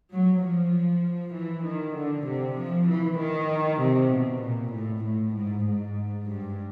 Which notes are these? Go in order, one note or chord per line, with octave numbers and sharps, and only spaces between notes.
F#3
F3
E3
D#3
D3
C3
F3
E3
D#3
C3
B2
A#2
A2
A2
G#2
G#2
G2